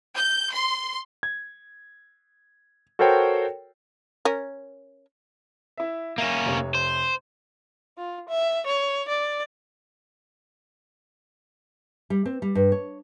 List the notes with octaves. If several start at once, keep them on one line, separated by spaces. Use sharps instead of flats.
G6
C6
G#6
F#4 A4 A#4 C5 C#5 G5
C#4 A#4
E4 E5
A#3 C#4 E5 D#7 E7
F1 C3 C#5
C5
F4
E5
C#5
D5
G3
C4
G3
G2
C#5